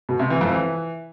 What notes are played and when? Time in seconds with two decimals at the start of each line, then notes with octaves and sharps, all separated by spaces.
0.09 B2
0.19 C3
0.30 E3
0.41 F2
0.52 E3